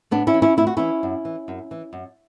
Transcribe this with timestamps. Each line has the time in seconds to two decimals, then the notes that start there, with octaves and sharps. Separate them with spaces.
0.11 A2 B3 D4
0.27 C#4 E4
0.34 E3
0.42 C#4 E4
0.57 A2 E4
0.67 F#4
0.77 E3 C#4 E4
1.03 F#2
1.25 E3
1.48 F#2
1.71 E3
1.93 F#2